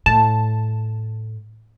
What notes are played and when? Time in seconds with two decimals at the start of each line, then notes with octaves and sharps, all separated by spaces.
0.06 A2 A5